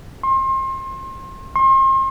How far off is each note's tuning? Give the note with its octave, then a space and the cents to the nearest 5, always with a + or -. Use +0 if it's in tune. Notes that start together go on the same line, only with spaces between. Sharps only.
C6 +35
C6 +40